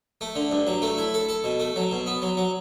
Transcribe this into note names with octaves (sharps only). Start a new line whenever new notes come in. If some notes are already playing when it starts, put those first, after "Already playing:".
A3
D3
G2
F#3
A3
E4
A4
A4
B2
A3
F#3
B2
B3
F#3
F#3